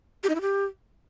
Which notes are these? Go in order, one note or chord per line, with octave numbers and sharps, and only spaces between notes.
G4
D#4
E4
G4